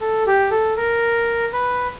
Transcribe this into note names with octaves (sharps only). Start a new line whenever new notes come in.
A4
G4
A4
A#4
B4